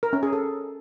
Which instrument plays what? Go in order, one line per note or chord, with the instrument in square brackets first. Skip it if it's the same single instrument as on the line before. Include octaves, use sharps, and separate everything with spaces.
[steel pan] A#4
C#4
G#4
A4